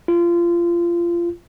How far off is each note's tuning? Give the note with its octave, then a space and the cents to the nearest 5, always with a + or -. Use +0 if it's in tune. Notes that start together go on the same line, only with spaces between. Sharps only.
F4 -25